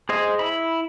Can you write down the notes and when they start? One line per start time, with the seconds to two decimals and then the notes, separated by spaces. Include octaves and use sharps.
0.09 G#4 C5 D#5
0.39 E4 B5